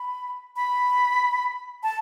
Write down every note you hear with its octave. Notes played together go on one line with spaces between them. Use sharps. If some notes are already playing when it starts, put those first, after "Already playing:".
Already playing: B5
B5
A5